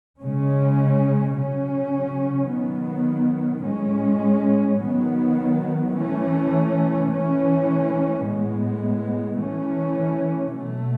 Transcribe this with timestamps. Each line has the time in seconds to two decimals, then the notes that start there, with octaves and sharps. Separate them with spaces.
0.20 C#3 G#3 C#4
1.35 C#3 F#3 C#4
2.49 D#3 F#3 B3
3.64 A2 G#3 C#4
4.80 D#3 F#3 B3
5.94 E3 A3 C#4
7.09 E3 A3 C#4
8.23 A2 G#3 B3
9.39 E3 A3 C#4
10.54 B2 F#3 A3